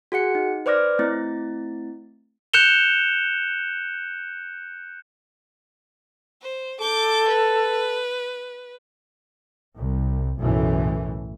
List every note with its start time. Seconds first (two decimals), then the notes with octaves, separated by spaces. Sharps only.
0.12 F#4 G#4 F#5 C#7
0.35 D#4
0.66 B4 C5 D5 D6 F6 A#6
0.99 A3 C4 E4 A6
2.54 F#6 G6 C#7 E7 F7 G7
6.42 C5
6.81 A4 D6 G6
7.29 B4
9.77 C2
10.39 B1 F#2 A2 E3 A3